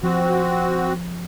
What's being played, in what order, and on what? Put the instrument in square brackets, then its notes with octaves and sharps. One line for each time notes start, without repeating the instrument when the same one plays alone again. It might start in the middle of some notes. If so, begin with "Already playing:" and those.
[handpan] F3 [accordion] C4 F#4